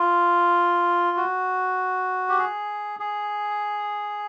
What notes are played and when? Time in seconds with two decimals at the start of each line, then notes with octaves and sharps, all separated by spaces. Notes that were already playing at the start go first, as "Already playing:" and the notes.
Already playing: F4
1.17 F#4
2.29 G4
2.38 G#4
3.00 G#4